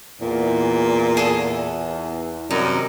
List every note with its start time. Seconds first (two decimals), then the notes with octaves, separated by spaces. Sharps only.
0.21 E2 A#2
1.17 G#4 A4
2.51 F#2 C3 D#3 G3 D#4